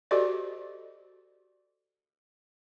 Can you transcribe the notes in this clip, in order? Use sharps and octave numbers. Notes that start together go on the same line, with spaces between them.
F#4 G4 A4 C5 D5 D#5